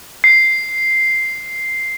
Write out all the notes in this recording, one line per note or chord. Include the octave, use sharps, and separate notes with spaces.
C7